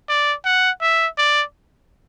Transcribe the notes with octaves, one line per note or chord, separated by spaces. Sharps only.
D5
F#5
E5
D5